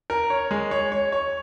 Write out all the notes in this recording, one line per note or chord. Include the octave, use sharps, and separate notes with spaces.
A#4
C#5
G#3
C#5
C#5
C#5